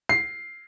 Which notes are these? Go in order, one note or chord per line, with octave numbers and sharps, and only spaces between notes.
C7